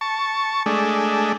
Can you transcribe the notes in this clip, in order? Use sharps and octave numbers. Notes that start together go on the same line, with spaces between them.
A5 C#6
G#3 A3 D4